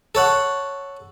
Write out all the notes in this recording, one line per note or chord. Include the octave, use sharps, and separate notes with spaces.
A4 C#5 F#5